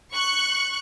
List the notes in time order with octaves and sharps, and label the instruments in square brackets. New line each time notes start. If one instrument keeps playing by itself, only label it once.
[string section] C#6 F#6